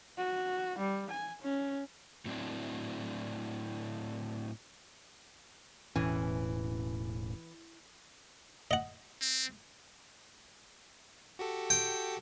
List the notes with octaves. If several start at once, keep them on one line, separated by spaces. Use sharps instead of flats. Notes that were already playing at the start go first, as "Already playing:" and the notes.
F#4
G3
G#5
C#4
A2 F#3 C4 D4 E4
E1 A2 E3 C#4
D#5 F#5
C4
F#4 G4 A4
G5